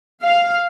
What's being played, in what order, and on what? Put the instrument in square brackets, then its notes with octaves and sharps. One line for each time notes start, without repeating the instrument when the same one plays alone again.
[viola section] F5